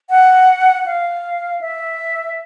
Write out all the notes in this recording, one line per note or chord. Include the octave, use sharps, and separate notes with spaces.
F#5
F5
E5